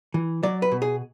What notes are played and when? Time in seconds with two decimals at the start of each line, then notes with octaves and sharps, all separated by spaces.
0.14 E3
0.43 F#3 D5
0.62 B4
0.72 B2
0.82 G#4